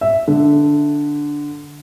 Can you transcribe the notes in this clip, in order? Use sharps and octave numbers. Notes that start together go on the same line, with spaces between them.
E5
D3